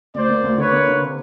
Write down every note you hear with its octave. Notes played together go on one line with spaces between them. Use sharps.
D2 C5 D5
A#3
D2
D3 B4 C#5
A#3
D3
C3